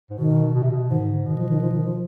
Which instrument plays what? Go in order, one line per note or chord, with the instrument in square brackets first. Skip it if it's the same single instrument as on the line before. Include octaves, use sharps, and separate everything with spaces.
[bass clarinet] G#2
[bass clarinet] B2 [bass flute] D#3
[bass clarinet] B2
C3
B2
[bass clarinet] G#2 [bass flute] D#3
[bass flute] D3
[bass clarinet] B2 [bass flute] D#3
[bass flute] F3
D#3
F3
D#3
F3